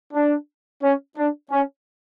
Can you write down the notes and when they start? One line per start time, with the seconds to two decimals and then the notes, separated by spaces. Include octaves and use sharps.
0.14 D4
0.83 C#4
1.17 D4
1.51 C#4